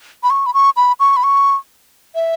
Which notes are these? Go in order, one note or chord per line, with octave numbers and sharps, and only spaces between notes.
B5
C#6
B5
C#6
B5
C#6
B5
C#6
E5